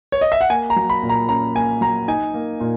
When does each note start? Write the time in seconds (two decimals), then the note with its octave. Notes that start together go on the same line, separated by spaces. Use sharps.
0.12 C#5
0.21 D#5
0.32 E5
0.41 F#5
0.50 A#3 G#5
0.70 A#5
0.76 F#3
0.89 B5
1.03 A#2
1.09 A#5
1.29 C#4 A#5
1.55 A#3 G#5
1.81 F#3 A#5
2.08 D#4 G#5
2.34 A#3
2.60 A#2